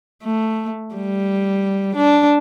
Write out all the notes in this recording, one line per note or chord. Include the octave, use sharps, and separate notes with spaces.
A3
G3
D4